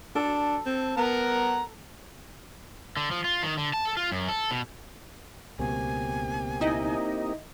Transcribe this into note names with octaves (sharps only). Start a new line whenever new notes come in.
D4 A4
C4
B3 A#4 F#5 A#5
D3
F3
F4
D#3
D3
A5
A4
F4
F#2
A4
B2
C#2 B2 A#3 C4 G4 G#5
D#4 E4 D#5